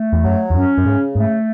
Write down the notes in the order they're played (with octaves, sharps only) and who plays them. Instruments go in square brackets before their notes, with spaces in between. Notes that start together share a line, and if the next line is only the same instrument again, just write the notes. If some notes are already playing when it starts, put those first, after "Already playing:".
Already playing: [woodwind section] A3
[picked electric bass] E2
[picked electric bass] F#2 [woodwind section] F#3
[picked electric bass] E2
[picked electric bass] F#2 [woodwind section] C#4
[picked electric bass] F#2
[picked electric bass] G#2 [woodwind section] C#3
[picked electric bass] G#2 [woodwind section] A3